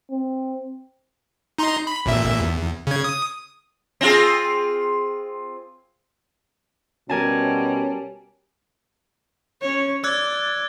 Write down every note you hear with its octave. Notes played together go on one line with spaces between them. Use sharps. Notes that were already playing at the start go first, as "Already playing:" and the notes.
C4
D#4 A#5 C6
B5
A1 A#2 E5
E2
C#3 G#6
D#6
C4 F4 G#4
B2 G3 C#4 A#4 G#5 A5
C#4 C#5
D5 E6 F#6 G#6